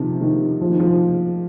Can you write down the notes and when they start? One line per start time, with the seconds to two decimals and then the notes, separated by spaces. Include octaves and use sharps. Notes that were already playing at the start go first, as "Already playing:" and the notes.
Already playing: C3 D#3 F3
0.21 D#3
0.61 F3
0.70 D#3
0.79 F3